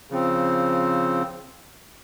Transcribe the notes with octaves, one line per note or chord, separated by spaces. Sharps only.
C#3 F3 C4